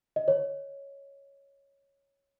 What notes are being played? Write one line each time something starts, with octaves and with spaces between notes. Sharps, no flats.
D#5
C#5